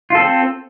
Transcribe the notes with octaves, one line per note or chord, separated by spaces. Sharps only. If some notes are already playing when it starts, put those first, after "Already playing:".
C4 F4 A4